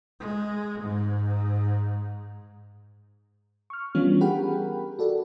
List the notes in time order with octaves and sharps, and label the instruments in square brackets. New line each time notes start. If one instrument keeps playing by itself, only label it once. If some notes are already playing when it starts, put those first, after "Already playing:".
[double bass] G#3
G#2
[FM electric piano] C#6 F6
E3 G3 B3 C#4 D4 F4
G4 G#4 A#4 F#5 G5 B5
F#4 A4 D5